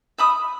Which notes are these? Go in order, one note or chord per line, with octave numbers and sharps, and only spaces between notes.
E5 B5 D#6